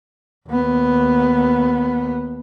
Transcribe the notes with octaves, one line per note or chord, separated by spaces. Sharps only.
D#2 B3